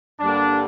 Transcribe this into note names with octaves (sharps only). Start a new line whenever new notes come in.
G2 D3 G3 A#3 D4